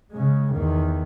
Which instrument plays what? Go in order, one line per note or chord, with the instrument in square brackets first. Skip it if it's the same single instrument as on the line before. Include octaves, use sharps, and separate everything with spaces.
[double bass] C#3 G#3
E2 D#3